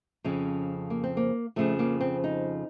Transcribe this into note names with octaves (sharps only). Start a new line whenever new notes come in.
F2 C#3 F3 C#4
A#3
C4
A#3
F2 C#3 F3 A3
A#3
C4
D#4